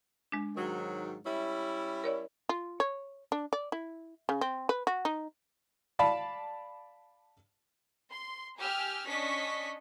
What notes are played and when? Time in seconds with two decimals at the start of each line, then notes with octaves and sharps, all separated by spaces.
0.32 G#3 D4
0.56 G#2 D#3 F#3
1.24 G3 C#4 E4
2.04 A#4 C#5 D5
2.49 F4
2.80 C#5
3.32 D4
3.53 D5
3.72 E4
4.29 C#3
4.41 C4
4.69 B4
4.87 F#4
5.05 D#4
5.99 D5 F5 A5 B5
8.10 C6
8.58 G4 G#5 E6 F6
9.06 C#4 D4 D#5 C#6 B6